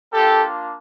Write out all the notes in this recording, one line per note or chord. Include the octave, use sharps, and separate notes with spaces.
A#3 D4 F4 G4 A4